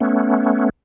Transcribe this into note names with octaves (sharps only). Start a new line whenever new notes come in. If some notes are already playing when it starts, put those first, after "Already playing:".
A3 B3 C#4